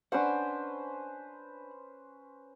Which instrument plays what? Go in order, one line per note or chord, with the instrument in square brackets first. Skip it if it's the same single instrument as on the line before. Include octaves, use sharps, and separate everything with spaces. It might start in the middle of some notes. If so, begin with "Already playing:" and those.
[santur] C#4 B4 C5 [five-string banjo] D4 F#5